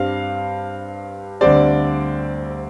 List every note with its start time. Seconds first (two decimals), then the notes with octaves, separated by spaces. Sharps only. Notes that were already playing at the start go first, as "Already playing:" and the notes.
Already playing: G2 G3 C4 F5
1.41 D2 D3 G3 C4 D5